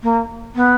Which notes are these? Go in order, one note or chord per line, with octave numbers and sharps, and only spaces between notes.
A#3
B3